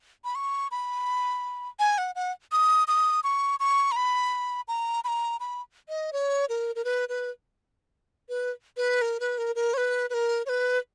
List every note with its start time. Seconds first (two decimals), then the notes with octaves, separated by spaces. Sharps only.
0.25 B5
0.35 C#6
0.71 B5
1.79 G#5
1.98 F#5
2.15 F#5
2.52 D#6
2.88 D#6
3.24 C#6
3.60 C#6
3.92 A#5
3.96 B5
4.68 A#5
5.04 B5
5.08 A#5
5.40 B5
5.89 D#5
6.13 C#5
6.49 A#4
6.75 A#4
6.85 B4
7.09 B4
8.29 B4
8.77 B4
9.02 A#4
9.20 B4
9.38 A#4
9.56 A#4
9.74 C#5
9.77 B4
10.10 B4
10.14 A#4
10.46 C#5
10.49 B4